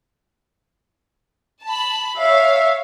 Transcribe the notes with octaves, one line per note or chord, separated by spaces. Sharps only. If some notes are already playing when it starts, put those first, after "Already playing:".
A5 B5
C#5 E5 F5